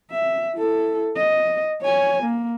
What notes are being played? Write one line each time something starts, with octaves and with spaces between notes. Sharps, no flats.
E5
E4 A4
D#5
C#5 G#5
A#3